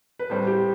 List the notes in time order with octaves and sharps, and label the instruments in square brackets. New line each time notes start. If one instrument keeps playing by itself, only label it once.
[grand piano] B4
[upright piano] A2 G3 C4 [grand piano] C5
[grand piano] G4